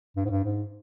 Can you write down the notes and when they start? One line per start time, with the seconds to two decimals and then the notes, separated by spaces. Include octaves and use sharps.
0.17 G2
0.25 G#2
0.30 G2
0.44 G#2